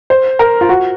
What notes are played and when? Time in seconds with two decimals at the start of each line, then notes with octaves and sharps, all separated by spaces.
0.10 C5
0.39 A#4
0.61 F4
0.69 F#4